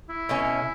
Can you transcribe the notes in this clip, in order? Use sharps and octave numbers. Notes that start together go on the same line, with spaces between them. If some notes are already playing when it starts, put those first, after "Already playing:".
E4
B2 A3 C#4